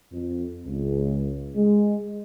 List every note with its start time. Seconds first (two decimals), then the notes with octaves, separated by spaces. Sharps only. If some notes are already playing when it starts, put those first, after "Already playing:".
0.12 F2
0.66 C#2
1.56 G#3